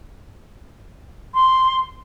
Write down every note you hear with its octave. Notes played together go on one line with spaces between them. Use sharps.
C6